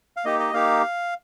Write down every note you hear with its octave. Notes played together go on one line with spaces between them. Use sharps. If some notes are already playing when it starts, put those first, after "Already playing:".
F5
A#3 D#4 G4 D#5
D#5
A#3 D#4 G4 F5